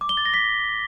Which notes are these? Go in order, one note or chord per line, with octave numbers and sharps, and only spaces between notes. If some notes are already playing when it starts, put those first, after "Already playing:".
D6
G7
A6
A#6
B6